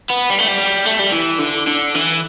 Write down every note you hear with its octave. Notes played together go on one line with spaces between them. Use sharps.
B3
G3
A3
G3
A3
G3
E3
D3
D3
E3